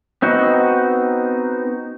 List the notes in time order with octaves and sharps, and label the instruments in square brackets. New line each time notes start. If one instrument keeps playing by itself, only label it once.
[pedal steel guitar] B3 C4 D#4 F#4